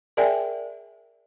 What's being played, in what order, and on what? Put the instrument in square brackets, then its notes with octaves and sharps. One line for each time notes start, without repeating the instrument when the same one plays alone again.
[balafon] G#4 A#4 D5 E5 G5 G#5